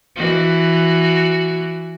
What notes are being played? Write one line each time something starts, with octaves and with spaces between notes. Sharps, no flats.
E3 F#4